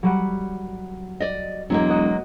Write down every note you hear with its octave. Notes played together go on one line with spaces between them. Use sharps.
F#3 G3 F#5
D5 D#5
E1 F#3 G#3 A#3
F#4 D#5 F#5